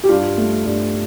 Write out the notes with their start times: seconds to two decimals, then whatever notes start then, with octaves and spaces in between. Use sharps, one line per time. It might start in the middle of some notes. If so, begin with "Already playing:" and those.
0.04 G4
0.09 G2 F4
0.37 A3
0.66 G2